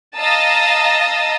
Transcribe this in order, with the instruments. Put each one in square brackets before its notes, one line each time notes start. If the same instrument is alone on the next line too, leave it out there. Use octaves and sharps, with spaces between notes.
[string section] D#5 F5 A5 A#5 D#6 E6